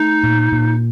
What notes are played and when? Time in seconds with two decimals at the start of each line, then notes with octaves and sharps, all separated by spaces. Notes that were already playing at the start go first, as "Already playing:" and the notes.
Already playing: A3 D#4
0.23 A#2
0.52 A#2